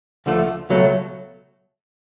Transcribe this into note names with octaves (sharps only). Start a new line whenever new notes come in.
D2 D3 F3 A3
C#2 B2 F#3 A3